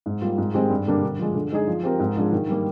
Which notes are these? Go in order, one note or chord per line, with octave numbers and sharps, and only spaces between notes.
G#2
G3 A#3 F4
G#2
D#3 G#3 C4 G4
G2
D3 G3 A#3 D4
D3
F3 G#3
D3
G#3 D#4 G#4
F3
C4 G4 A#4
G#2
F3 G#3 D4 G#4
D#3
G3 A#3